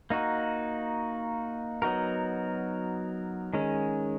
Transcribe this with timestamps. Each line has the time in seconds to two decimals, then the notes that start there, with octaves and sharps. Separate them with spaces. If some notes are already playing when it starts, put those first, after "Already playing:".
0.10 A#3 D#4 F#4
1.82 F#3 B3 D#4 F#4 A#4
3.54 D#3 G#3 C#4